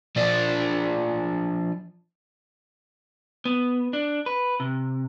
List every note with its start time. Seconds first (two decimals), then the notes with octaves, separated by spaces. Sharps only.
0.16 F3 D4
3.45 B3
3.93 D4
4.26 B4
4.60 C3